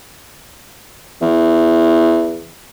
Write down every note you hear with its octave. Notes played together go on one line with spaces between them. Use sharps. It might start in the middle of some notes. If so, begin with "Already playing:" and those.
E2